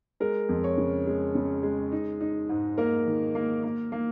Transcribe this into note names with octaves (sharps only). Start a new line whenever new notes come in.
G#3 A#4
F2
C#5
C#3
G#3
C#3
G#3
D#4
D#4
G#2
A#3 A#4
D#3
A#3
A#3
A#3